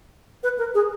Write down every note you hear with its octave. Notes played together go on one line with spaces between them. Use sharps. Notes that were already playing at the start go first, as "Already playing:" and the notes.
B4
A#4
G#4